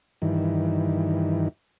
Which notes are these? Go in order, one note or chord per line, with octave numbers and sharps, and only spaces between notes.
G2 D#3 E3